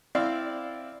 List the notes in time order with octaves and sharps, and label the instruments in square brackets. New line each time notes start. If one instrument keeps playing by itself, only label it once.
[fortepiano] C4 E4 D5 F5